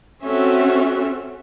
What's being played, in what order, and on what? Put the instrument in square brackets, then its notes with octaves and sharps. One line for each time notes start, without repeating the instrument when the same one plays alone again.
[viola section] C4 C#4 F#4 A4 E5